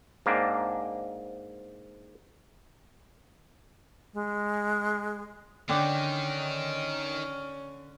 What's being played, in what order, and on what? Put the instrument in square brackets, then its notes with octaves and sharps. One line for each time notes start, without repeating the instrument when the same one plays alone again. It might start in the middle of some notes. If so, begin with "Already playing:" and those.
[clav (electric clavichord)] G#2 A#3 C4 D4
[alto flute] G#3
[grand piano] D3 [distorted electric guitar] D#3 [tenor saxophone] C#4 [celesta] G5 D6 G6